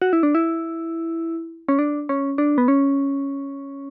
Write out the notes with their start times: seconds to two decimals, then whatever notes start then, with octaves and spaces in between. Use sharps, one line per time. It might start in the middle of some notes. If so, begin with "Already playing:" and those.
0.02 F#4
0.13 E4
0.23 D4
0.35 E4
1.69 C#4
1.79 D4
2.09 C#4
2.38 D4
2.58 B3
2.68 C#4